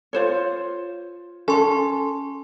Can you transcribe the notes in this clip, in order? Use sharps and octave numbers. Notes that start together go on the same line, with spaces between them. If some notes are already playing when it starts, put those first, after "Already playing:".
F4 C5 C#5
C#4 A4 G#5 C6